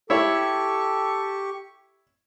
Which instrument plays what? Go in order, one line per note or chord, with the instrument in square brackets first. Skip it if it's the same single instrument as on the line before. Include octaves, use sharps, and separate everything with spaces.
[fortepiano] E4 C#5 [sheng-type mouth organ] G4 C#6 [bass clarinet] A4